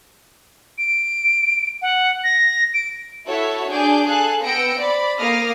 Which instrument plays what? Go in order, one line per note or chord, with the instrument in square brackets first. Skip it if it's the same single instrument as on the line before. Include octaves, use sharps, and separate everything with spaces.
[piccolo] D7
F#5
A#6
D7
[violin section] E4 F#4 A4 C#5 E5 A5
D4 G#4 D6 G6
G#4 A4 F5 A5 F#6
B3 G5 E6 A#6 C#7 D7
C5 D5 B5
A#3 D6 D#6 F6 A#6 C7